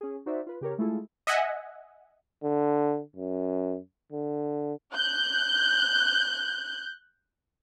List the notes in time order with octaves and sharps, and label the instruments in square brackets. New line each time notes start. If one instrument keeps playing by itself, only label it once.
[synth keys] C#4 G#4
D#4 F#4 C5 D5 E5
F4 B4
C#3 G4 A#4 C#5
G#3 A3 E4 F4 G#4 A4
[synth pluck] D#5 E5 F#5 G#5
[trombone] D3
F#2
D3
[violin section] F#6 G6